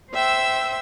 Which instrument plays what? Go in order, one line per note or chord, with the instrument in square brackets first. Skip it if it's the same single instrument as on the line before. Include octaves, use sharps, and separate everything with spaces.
[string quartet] C5 E5 G5 E6